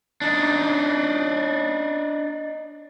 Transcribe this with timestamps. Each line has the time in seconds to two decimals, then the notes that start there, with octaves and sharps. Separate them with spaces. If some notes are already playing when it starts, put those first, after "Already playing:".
0.22 D4 D#4